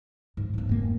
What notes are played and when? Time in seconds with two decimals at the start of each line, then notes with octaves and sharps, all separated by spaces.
0.37 G#2
0.54 G#2 B3
0.69 F1 A#3